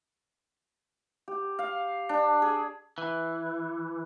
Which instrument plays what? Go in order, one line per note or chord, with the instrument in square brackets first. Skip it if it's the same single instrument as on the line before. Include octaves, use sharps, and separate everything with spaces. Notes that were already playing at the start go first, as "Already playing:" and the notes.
[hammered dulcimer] G4
F5
D4
G#4
[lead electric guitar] E3